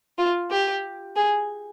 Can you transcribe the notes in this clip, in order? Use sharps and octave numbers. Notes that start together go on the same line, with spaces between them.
F4
G4
G#4